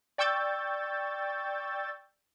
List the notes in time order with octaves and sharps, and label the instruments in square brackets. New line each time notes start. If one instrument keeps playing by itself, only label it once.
[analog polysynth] D5 G5 C#6 E6 G6 A6